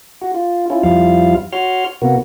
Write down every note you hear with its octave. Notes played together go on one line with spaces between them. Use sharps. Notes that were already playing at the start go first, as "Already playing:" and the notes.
F#4
F4
C#4 E4 F4
F2 F3 G3 E4 F4 F5
F#4 C#5 C6 F6
C3 A#3 B3 F#4